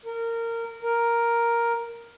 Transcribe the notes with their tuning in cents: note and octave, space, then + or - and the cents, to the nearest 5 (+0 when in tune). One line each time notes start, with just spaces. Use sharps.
A#4 -20
A#4 +5